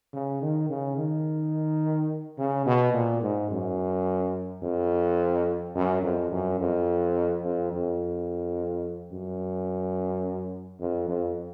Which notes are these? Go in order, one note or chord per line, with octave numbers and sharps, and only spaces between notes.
C#3
D#3
C#3
D#3
C#3
B2
A#2
G#2
F#2
F2
F#2
F2
F#2
F2
F2
F2
F#2
F2
F2